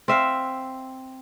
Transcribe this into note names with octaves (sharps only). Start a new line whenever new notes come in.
C4 E5 F5